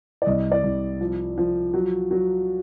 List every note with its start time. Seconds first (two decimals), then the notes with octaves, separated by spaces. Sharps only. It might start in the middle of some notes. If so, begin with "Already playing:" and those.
0.22 D5
0.26 C2 D#5
0.52 D5
0.64 C2
1.01 F3
1.38 F3
1.74 F#3
2.11 F#3